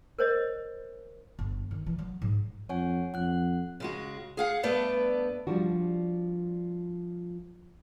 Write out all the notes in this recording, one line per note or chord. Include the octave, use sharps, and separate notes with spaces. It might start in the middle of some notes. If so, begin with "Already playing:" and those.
A#4 C5 C#5 D#5
G1
D#3
E3
F#3
G#2
F2 C#5 F#5 G#5
F2 F#5 F#6
C#3 G#3 F#4
G#4 F5 F#5
G2 A3 B3 B4 D5
F3 G3 D4 F#4